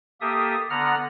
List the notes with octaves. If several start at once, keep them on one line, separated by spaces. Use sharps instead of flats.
A#3 G4 A4 E5 D#6
D3 B3 F#5 A#5 F6